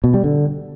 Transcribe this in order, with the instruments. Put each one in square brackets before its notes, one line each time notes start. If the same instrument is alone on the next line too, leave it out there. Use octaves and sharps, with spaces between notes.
[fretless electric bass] B2
G3
D3